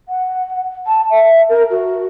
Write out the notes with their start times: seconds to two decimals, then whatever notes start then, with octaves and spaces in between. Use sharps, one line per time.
0.08 F#5
0.86 A5
1.10 E5
1.49 A#4
1.70 F#4